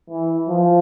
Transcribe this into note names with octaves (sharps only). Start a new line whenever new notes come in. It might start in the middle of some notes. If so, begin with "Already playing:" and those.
E3
F3